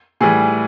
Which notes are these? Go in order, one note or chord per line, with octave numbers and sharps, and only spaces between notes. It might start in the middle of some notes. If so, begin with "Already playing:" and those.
A2 E3 G3 G#4